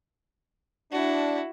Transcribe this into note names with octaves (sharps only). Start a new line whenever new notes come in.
D4 E4 F#4